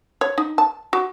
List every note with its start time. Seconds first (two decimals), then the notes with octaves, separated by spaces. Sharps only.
0.21 C#5
0.38 D#4
0.58 A5
0.93 F#4